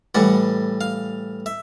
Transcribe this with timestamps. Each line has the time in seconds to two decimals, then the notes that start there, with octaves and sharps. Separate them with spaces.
0.15 A2 E3 G3 F#5
0.81 F5
1.46 E5